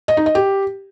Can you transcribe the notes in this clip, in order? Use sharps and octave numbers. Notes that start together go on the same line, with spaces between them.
D#5
D#4
D#5
G4